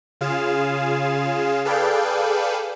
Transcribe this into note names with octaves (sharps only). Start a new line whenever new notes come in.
C#3 F4 G#4 F5 E7
G#4 A4 B4 D5 F5 G5